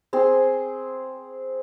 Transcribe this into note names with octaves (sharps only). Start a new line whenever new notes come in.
C4 G#4 C6